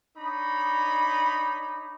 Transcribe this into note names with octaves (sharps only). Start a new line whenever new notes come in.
D4 D#4 C#5 B5 D#6